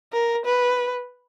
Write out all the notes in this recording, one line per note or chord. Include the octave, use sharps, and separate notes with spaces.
A#4
B4